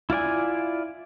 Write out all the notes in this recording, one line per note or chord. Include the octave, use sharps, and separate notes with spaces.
E4 F4 D5 G#5